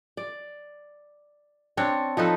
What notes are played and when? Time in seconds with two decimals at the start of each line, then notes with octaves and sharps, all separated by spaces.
0.17 D5
1.77 C4 D4 C#5
2.17 F3 D#4 A4 B4